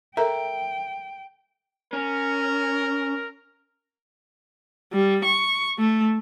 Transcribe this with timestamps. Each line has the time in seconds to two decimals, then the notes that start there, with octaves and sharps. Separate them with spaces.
0.17 A4 A#4 E5 G5 A#5
1.93 C#4 A#4
4.93 G3
5.24 C#6
5.79 A3